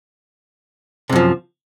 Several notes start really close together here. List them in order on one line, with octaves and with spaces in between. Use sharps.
C3 F#2 F3